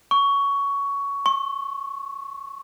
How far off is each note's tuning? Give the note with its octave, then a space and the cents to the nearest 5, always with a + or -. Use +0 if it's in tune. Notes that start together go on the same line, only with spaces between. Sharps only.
C#6 +15
C#6 -35